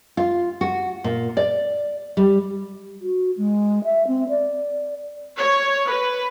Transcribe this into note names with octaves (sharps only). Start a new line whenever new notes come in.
F4
F#4
A#2
D5
G3
F#4
G#3
E5
C4
D5
C#5
B4